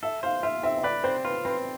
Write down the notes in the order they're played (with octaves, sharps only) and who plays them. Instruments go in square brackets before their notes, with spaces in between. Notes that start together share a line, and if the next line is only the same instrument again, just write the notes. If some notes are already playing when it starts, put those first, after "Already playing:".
[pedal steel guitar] A4 [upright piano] E5
[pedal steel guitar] C5 [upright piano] F5
[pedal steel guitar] F4 [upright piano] E5
[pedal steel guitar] C4 [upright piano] E5
[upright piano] E5
[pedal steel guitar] B4 [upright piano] D5
[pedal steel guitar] C4 [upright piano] C5
[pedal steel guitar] F4 [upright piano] B4
[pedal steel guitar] C4 [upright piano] B4